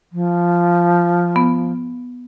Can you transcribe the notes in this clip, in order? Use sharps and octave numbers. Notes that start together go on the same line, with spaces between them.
F3
B3